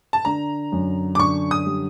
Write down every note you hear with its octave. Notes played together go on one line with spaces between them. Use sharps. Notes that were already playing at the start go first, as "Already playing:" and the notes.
A5
D3 A#5
F#2
D6
D3 C#6
D#6
G3